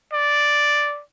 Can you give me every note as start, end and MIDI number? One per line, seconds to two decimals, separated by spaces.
0.13 1.02 74